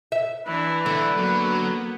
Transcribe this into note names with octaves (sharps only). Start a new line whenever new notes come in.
E5
E3 D4 B4
D3 A3
F#3 A#3 B3